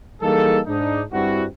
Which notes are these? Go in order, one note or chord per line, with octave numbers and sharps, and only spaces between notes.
E3 G3 A#3 D#4 G#4 A4
G#2 D4 D#4
G2 G3 C4 D4 E4 F#4